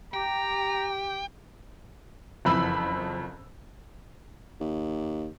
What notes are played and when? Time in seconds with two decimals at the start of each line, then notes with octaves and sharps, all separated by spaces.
0.14 G4 G5 A#5
2.45 F#1 F2 E3 B5 E6
4.61 D#2